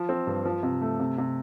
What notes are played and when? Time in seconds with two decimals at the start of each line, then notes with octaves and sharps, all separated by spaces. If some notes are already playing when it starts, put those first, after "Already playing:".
Already playing: F3
0.09 C4
0.27 G2
0.45 F3
0.63 C3
0.81 A3
1.00 C3
1.18 C3